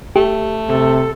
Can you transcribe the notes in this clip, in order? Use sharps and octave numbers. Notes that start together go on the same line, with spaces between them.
A3 G4
C3 A4